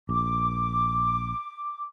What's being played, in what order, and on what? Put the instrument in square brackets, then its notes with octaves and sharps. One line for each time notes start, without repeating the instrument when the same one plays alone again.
[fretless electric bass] A#1 [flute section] D6